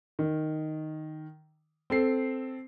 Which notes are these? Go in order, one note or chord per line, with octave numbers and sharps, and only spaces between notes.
D#3
C4 A4 C7